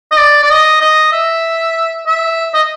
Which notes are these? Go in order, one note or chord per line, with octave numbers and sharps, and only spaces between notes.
D#5
D5
D5
D#5
D#5
E5
E5
D#5